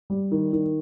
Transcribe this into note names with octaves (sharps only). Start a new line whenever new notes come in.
G3
D#3
D#3